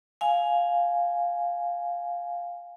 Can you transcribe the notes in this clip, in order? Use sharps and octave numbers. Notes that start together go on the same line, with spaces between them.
F5 G#5